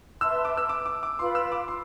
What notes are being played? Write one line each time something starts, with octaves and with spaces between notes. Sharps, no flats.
B4 E5 A5 C6 E6
D6
E6
D6
D6
D6
F4 B4 F5 B5 C6
E6
D6
C6